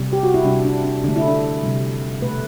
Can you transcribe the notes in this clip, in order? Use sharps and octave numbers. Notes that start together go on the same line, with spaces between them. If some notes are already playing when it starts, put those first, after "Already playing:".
Already playing: C3 G3
G4
F#4
E4
C3 G3 D4
D4
D4
D3 A3 D4
E4
D4
C3 G3
B2 A3 B4